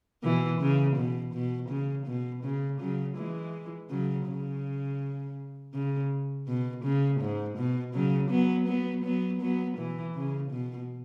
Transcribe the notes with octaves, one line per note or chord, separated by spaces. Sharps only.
B2 E3
C#3
B2
B2
C#3
B2
C#3
C#3 F#3
E3 G#3
C#3 F#3
C#3
C#3
B2
C#3
G#2
B2
C#3 F#3
F#3 B3
F#3 B3
F#3 B3
F#3 B3
B2 E3
C#3
B2